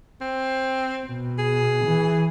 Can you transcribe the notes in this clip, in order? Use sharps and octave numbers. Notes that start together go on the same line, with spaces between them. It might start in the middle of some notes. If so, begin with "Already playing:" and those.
C4
B2
G#4
E3